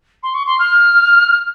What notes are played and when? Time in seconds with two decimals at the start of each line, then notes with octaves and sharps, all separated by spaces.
0.23 C6
0.34 C#6
0.46 C6
0.59 F6